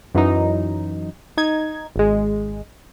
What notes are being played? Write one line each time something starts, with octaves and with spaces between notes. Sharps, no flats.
F#2 E3 F#3 D#4
D#4 G#6
G#1 G#3